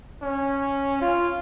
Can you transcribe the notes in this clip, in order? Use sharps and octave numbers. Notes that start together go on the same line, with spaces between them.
C#4
F4